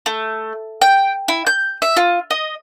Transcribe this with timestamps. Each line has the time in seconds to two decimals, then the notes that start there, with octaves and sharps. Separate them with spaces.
0.06 A3
0.81 G5
1.28 E4
1.47 G6
1.82 E5
1.97 F4
2.31 D#5